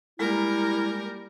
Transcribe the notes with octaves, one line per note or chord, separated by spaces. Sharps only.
G3 G#3 A#3 E4 F4 A#4